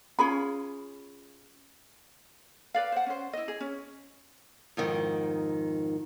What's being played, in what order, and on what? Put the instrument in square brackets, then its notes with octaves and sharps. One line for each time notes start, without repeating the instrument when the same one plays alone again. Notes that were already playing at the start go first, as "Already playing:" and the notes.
[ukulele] C#4 F4 G#4 B5
B4 D5 F5
C5 F#5
C#4 C5
E4 D#5
G#4
C#4
[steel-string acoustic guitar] F2 G#2 D#3